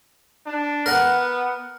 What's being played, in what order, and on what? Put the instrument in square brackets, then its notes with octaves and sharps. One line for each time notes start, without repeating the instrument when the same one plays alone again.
[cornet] D4
[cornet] B3 [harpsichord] A#4 F#5